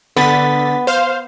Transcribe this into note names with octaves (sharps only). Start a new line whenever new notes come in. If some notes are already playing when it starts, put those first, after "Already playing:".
D3 B3 A6 B6
C5 F5